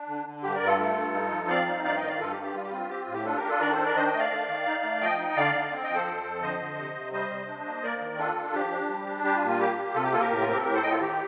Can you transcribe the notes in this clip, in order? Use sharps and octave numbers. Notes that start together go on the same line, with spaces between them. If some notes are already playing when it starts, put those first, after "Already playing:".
Already playing: D4
D3
D3
G2 G4
A#4 D5
G2
F4 A4
A3
G2
D#4
F3
C4 D5 F5
D#4
G2 D5 F5
D#3 D#5 G5
D5 F5
G2 F4 A4
G4
G2
G4
G3 F4
G4
C4 F4
C4 G4
F4
A2
G4
D4 F4 A4
G4 A#4
D4
F4 A4
D#3 A#4 D5
A4 C5
D4
A#4 D5
D#3 C5 D#5
D#5 G5
A3
D5 F5
A3
D#3
D#4
A3
F3 D#5 G5
D#4
D3 D5 F5
D3
C4
D#5 G5
F3
A4 C5
F2
F2
D3 C5 D#5
D3
C3
C3
G3 C5 D#5
C3
D4
A#3
A#3 A#4 D5
D#3
D4 F4 A4
D4
F3 G4
D4
G3
D4
G3 G4
F4
A#2
F4
A#3 G4
A#3
C3 F4 A4
G4
A#3 F4 A4
G4 A#4
A2
F4
C4 G4
A4
A2 G4 A#4
A4 C5
A2 D#5 G5
F4 A4
D#3 G4